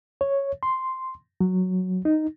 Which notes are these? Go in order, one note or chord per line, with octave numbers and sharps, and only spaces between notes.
C#5
C6
F#3
D#4